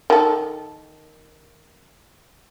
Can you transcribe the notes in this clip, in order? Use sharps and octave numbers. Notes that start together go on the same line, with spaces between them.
D#3 A4